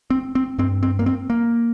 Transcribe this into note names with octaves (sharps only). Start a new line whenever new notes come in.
C4
C4
G2 C4
C4
A#3
C4
A#3